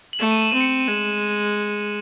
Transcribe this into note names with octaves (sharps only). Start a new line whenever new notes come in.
F#7
A3 E7
D#7
E7
C4 D#7
C#7
D#7
D#7
G#3 E7